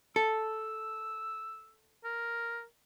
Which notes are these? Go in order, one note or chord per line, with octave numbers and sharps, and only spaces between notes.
A4 E6
A#4